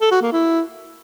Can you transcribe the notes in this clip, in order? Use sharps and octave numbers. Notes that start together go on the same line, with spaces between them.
A4
F#4
A#3
E4